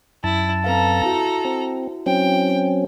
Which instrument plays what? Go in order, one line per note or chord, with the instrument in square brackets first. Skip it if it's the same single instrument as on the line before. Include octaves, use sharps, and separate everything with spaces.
[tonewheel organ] F#2 A5 [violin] E4
[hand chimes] C4 B4 F5 [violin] A4 A#5
[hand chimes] E4 F#4
[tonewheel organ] C4
[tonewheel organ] F#3 C4 C#4 [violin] G5